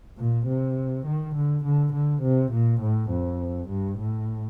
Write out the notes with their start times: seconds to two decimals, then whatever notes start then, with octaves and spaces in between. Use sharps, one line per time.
0.18 A#2
0.47 C3
1.06 D#3
1.35 D3
1.64 D3
1.93 D3
2.22 C3
2.52 A#2
2.81 A2
3.10 F2
3.69 G2
3.98 A2